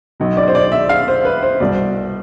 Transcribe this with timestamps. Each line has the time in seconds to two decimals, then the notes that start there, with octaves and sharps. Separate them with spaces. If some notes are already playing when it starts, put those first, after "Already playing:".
0.20 B1 B2
0.37 D5
0.48 C5
0.55 D5
0.72 E5
0.89 F5
1.08 C5
1.25 B4
1.43 C5
1.60 C2 B2 D5